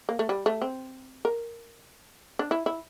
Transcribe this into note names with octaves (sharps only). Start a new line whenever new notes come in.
A#3
A3
G3
A3
C4
A#4
D4
E4
E4